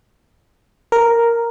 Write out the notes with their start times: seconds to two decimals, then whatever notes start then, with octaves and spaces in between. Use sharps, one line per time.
0.92 A#4